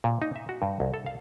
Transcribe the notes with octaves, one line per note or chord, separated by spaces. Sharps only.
A#2
D#4
E5
F#4
G2
C2
A4
F5